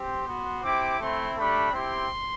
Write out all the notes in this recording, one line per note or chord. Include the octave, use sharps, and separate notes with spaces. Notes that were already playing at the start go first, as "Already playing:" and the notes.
Already playing: C4 G4 C6
B3 F#4
C4 E4 G4 D6
A3 C4 E4 C6
A3 D4 G4 B5
C4 E4 G4 C6